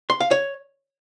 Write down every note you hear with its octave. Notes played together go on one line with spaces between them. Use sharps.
C6
F5
C#5